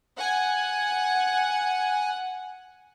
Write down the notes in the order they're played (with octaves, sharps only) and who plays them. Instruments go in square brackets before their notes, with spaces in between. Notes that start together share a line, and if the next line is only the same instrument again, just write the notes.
[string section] F#5 [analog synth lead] G#5